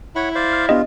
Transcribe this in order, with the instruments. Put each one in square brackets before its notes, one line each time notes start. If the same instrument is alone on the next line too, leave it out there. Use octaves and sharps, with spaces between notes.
[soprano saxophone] E4 [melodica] C#5 F#5 B5
[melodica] C5 D5 F5
[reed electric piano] F6
[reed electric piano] B3 D4 G4 [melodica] F4 [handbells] D#5